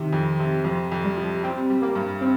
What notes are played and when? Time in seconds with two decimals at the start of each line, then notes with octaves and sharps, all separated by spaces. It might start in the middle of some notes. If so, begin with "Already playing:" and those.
Already playing: C3 D#3
0.13 F2
0.39 C3
0.64 F2 F3
0.92 F2
1.05 G3
1.17 F3
1.43 G3 C4
1.70 G3
1.82 A#3
1.95 G2
2.21 C4